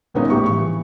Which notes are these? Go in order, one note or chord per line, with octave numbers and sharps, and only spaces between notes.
G1 A#2 B3 C#4 D#4
A#1 A2 G4 C#6
E3 C#6